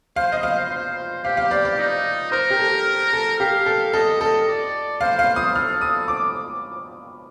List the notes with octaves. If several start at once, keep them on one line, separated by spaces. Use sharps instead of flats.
C5 F5
D#5
F5
C5
G4 F5
F5
D5
D5
D#4
A#4 C5
G4
A4
A4
G4 F5
A4
A4 D#5
A4
D5
C5 F5
F5
D#6
A4 F6
D#6
D6